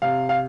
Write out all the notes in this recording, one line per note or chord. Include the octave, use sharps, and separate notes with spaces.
C3 F5
F5